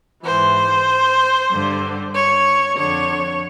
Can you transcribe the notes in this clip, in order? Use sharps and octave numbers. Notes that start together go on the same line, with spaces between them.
E3 C5
G#2
G2 D3
C#5
F2 D3 C#5